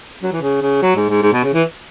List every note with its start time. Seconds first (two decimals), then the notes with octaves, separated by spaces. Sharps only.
0.23 F#3
0.33 E3
0.41 C#3
0.61 C#3
0.82 F#3
0.96 G#2
1.09 G#2
1.22 G#2
1.33 B2
1.44 C#3
1.54 E3